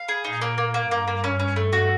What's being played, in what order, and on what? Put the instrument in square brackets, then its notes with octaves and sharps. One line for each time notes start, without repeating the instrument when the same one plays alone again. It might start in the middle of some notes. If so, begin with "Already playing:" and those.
Already playing: [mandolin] F5
G#4
[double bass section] A#2 [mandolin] D#4
[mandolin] A#3
A#3
A#3
[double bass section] G2 [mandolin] A#3
[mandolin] A#3
C#4
C#4
A3
F#4